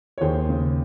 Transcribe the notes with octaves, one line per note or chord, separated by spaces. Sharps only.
C#5
D#2 G#4 C5
C#3